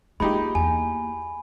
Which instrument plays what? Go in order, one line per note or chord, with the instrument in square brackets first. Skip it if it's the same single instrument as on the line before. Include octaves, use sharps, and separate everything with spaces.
[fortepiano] G#3 D#4 G4 [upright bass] A#3 F4 [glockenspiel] B5
[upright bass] E2 A#3 [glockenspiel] G#5